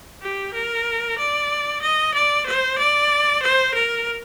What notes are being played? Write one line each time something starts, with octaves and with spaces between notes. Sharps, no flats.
G4
A#4
D5
D#5
D5
C5
D5
C5
A#4